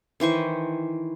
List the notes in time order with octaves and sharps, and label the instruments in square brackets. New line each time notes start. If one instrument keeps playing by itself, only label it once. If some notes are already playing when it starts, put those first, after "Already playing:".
[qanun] D#3 E3 C5 C#6